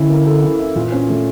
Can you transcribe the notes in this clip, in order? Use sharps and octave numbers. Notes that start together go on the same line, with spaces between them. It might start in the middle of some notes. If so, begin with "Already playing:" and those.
Already playing: D3 E3 C#4 E4
A#3
A4
E3
E4
A#2 E3
C#4
A3